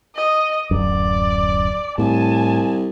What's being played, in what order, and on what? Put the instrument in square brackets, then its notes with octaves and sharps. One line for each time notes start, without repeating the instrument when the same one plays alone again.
[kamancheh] D#5
[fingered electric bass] D1 F#2 [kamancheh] D5
[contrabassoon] C2 [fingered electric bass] A2 [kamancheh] G#5 A5